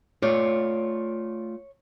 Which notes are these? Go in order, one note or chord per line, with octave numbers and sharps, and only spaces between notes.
A3 F4 C#5 D5